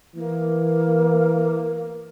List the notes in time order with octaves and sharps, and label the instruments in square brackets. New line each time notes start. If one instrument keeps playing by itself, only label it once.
[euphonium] E3 [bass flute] A#3